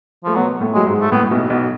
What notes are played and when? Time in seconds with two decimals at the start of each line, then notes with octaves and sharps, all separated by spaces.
0.24 F3 A3
0.36 B2 F#3 B3
0.60 A2 A3
0.73 F#3 G#3
0.86 G#2 G#3
1.01 A3
1.11 A2 B3
1.23 A2
1.31 B1 B2
1.50 B1 B2